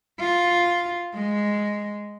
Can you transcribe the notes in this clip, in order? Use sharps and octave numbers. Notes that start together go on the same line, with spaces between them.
F4
G#3